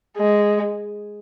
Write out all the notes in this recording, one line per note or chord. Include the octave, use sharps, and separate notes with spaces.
G#3